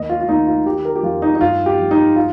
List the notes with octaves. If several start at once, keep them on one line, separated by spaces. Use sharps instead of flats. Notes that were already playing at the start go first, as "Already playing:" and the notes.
Already playing: D#2 D#5
F4
F4
D#2 D#4
F4
D#3 G4
A#4
G4
F2 F4
D#4
D#4
G2 F4
G4
F3
D#4
F4